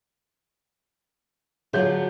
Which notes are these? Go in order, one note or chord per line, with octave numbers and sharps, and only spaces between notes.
D3 F#3 F4 G#4 C#5 G6